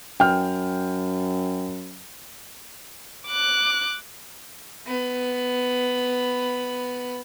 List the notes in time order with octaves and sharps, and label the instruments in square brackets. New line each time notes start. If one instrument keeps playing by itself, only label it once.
[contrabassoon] F#2 [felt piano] G5 F6
[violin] D6 F#6
[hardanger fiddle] B3 B5